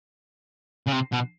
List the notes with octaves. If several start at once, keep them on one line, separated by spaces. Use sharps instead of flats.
C#3
C3
B2